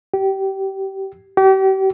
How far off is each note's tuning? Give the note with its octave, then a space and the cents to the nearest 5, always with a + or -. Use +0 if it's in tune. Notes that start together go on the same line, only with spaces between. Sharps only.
G4 -20
G4 -35